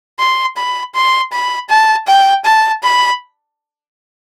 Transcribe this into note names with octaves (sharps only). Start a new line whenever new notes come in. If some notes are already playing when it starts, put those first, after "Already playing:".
C6
B5
C6
B5
A5
G5
A5
B5